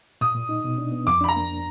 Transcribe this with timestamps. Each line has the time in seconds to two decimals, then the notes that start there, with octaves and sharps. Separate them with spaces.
0.21 A#2 D#6
0.35 A#2
0.49 D#4
0.64 B2
0.78 D4
0.92 B3
1.07 F2 D6
1.21 D4 B5
1.29 A#5
1.36 A#3